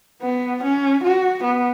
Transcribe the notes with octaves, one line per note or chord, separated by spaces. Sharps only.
B3
C#4
F#4
B3